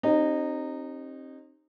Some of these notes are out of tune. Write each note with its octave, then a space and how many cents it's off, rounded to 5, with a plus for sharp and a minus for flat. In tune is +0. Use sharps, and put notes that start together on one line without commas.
C4 +35 D#4 -20 G4 +0